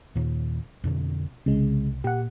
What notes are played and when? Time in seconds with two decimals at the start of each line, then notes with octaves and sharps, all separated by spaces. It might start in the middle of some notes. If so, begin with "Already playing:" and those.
0.15 D#2 A#2
0.84 F2 B2 D3
1.46 C2 C#3 G#3
2.04 A#2 G4 F#5